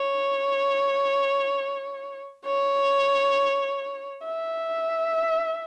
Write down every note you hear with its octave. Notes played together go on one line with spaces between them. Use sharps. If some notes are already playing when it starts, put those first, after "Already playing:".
Already playing: C#5
C#5
E5